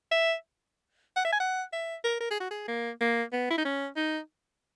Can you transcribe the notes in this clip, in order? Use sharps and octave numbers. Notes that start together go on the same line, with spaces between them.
E5
F#5
E5
G#5
F#5
E5
A#4
A#4
G#4
F#4
G#4
A#3
A#3
B3
E4
D#4
C#4
D#4